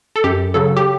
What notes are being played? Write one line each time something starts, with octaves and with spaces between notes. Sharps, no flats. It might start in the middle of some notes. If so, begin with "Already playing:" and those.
A4
F#2 G4
C#3 F#3 A4
G4